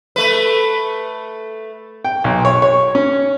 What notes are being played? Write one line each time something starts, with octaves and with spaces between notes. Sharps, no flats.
A3 B4
G5
B1
C#5
C#5
C#4